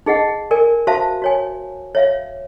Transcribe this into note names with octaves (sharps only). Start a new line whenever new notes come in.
D#4 G#4 D#5 F#5
A#4 D5 G#5
F#4 C5 E5 F5 A5
F#4 C#5 G#5
C#5 E5 F5